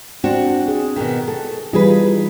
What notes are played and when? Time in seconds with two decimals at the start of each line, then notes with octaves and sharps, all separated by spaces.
0.24 C4 D4 F#4
0.68 G#4
0.96 B2 D#3
1.28 A4
1.73 E3 G3 D#4 F4 G#4 B4